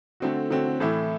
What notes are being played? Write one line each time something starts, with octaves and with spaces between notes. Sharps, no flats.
D3 A3 C4 F#4
D3 A3 C4 F#4
A2 E3 A3 E4